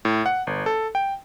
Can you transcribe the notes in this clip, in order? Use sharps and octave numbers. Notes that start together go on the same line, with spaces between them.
A2
F#5
G1
A4
G5